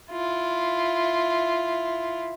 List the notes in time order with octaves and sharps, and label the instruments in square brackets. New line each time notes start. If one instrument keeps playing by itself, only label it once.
[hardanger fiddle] E4 F4